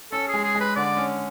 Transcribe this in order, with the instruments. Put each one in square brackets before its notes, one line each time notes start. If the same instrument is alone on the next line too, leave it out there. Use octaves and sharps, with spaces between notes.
[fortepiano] C#4 [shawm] A4
[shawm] G#4
[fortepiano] G#3
[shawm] G#4
[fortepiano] G#3
[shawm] B4
[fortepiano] D3 [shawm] D5
[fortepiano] C#4